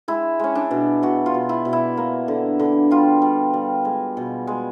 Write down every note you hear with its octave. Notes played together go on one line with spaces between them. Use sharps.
G#3 E4
G#3 C#4
D4
B2
B2 F#4
F4
B2
E4
B2
E4
A#3
D3
D3
G3 F4
G3
G3
G#3
B2
G#3